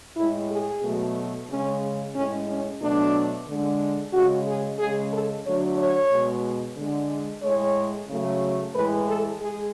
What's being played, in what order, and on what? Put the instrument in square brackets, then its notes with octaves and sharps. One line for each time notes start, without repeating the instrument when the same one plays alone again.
[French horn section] A2 G#3 E4
G#4
B2 F#3 A3
C#3 G#3 C#4
A2 G#3 C#4
C#4
B2 F#3 A3 D4
D3 G#3
C#3 G#3 F#4
G#4
C#3 G#3 G#4
A4
D3 F#3 A3 C#5
C#5
B2 G#3
D3 G#3
A2 G#3 C#5
C#3 F#3 A3
A2 E3 G#3 B4
A4
G#3 G#4